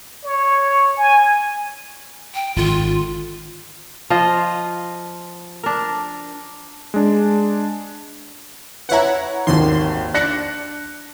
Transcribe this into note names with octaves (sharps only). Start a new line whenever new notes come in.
C#5
G#5
G5
G#1 D3 F4
F3 F4 D#5
D4 A#4
G#3 D4
E4 B4 C#5 F#5 A#5
G#1 D#2 D#3 C6
D4 F#6 A#6 C#7